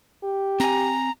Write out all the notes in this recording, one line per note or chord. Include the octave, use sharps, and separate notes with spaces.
G4
C4 G#5 A#5